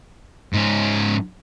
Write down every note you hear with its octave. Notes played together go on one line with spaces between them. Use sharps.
G#2 C#4